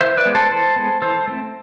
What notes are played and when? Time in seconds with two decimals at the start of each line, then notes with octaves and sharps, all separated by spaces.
0.01 E3 C5 E5
0.17 B4 D5
0.26 G#3 B3
0.35 A4 C5
0.51 E3 A4 C5
0.76 G#3 B3
1.02 E3 A4 C5
1.28 A3 C4